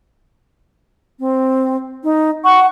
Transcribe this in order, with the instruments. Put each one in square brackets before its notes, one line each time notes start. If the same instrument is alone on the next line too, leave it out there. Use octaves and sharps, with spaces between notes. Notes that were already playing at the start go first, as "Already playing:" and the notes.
[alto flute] C4
D#4
[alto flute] F#5 [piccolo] C#6